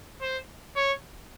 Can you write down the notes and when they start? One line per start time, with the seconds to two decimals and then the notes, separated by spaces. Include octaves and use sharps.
0.22 C5
0.76 C#5